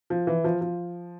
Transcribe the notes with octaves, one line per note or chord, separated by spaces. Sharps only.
F3
E3
F3
F3